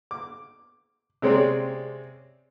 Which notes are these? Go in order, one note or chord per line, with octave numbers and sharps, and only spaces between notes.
D6
C3 G#3 C4 C#4 C#5 D5